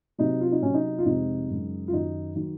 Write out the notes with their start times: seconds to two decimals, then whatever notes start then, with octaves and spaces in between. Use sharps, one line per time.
0.18 C3 F#3 D#4
0.41 F4
0.52 D#4
0.62 C3 F#3 C#4
0.74 D#4
0.98 F4
1.05 F2 C3 F3 G#3 D#4
1.49 F#2 C#3 G#3
1.88 F4
1.92 F#2 D#3 F#3 D#4
2.36 D#3 F#3